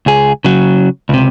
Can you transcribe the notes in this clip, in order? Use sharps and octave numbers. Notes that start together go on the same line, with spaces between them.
C#2 G#4
C#3 F#3
C#2 C3